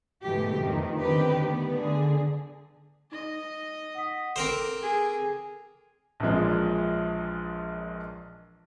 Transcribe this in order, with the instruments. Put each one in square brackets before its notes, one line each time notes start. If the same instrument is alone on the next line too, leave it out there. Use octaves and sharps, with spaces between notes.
[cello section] G#2 B2 D3 E3 A3 G4
F2 D#3 E3
D3 D#3 B3 C4 G4 B4
A3 B3
D3 G#4
[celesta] D#4 [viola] D#5
[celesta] F#5 D#6 B6
[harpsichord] C4 A#4 C5 [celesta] A4 D6
[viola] G#4
[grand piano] A#1 A#2 E3 F3 G#3